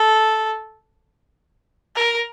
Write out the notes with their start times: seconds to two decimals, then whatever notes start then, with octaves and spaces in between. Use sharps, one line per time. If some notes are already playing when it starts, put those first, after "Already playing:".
Already playing: A4
1.96 A#4